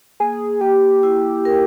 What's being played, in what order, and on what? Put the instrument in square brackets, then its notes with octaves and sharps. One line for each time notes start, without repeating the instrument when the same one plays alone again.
[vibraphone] A#3 [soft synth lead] G#4
[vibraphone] A#3 [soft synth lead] G4
[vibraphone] E4
A#4